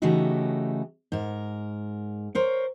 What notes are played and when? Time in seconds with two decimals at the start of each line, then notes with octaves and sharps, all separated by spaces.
0.02 C#3 E3 A3 D#4 F#4 G4
1.12 G#2 A#4
2.35 A#4 C5 C#5